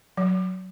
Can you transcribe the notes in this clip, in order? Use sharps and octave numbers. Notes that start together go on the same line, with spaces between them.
F#3